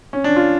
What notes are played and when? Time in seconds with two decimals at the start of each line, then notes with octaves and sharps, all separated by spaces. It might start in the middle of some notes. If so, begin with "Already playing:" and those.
0.13 C#4
0.24 D4
0.36 F4